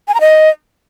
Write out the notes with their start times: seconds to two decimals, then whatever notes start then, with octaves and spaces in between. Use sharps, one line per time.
0.08 G#5
0.14 A#5
0.21 D#5